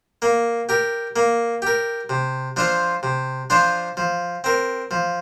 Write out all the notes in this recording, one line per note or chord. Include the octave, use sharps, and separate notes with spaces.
A#3
G4 A#4
A#3
G4 A#4
C3
F3 D4 F4 C5
C3
F3 D4 F4 C5
F3
C4 A#4
F3